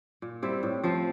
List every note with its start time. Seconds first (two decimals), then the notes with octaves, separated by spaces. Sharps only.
0.22 A#2
0.43 G3 C4 E4
0.63 A2
0.84 F3 C4 F4